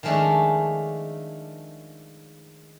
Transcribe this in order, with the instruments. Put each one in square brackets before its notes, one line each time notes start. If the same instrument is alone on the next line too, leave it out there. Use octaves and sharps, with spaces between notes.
[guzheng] D#3 F3 G#3 A3 C#4 D4